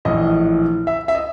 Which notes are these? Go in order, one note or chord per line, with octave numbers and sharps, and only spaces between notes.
A#1 A2 E3 D#5
E5
E5
D#5